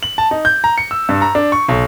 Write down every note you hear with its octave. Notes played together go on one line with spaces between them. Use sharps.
F#7
A5
D#4
G6
A#5
C#7
E6
G2
A#5
D4
C#6
B1